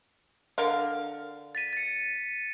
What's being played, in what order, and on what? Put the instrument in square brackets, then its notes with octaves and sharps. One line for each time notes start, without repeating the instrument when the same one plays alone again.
[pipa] D3 A#4 F5
[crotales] A6 B6 D#7
A6 C#7